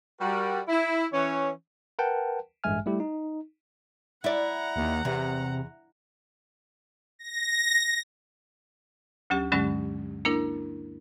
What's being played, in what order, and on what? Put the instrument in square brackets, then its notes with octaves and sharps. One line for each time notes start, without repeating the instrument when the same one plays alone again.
[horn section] G3 F#4 A#4
E4
E3 C#4 C#5
[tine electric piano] A#4 B4 F#5 G5 A5
A1 G2 G#3 E5 G#5 F6
G3 A3 E4 G4
D#4
[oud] E4 D5 [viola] F#5 A#5
[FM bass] D#2
[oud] E2 [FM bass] C3
[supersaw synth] A#6
[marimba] D2 F#3 C#4 G4
G2 D3 F#3 G#3 C#4
A#3 D4 E4 A#4